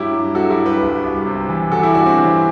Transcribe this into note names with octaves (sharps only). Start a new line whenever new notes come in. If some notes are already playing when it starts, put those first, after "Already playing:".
Already playing: G2 F#3 E4 G4
G2
F#3 F#4 A4
E4 G4
G2
G4 B4
C2
C2
C3
E3
E3 F#4 A4
E4 G4
G2 D4 F#4
C4
E3